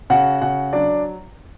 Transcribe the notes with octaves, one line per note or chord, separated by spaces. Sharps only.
C#3 F#4 F#5
C#3 F#4 F#5
F#3 D4 D5